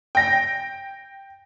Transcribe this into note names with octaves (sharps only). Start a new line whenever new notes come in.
G5 A#6